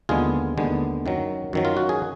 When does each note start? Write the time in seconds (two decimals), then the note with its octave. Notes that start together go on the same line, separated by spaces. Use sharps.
0.09 D#2 D3 G#3 B3 F4 G#4
0.57 D#2 D3 G#3 B3
1.06 F#2 D#3 F#3
1.53 F#2 D#3 F#3
1.65 F4
1.77 F#4
1.89 G#4